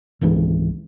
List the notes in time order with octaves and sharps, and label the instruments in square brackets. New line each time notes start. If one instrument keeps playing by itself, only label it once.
[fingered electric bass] G#1 C#2 G#2 E3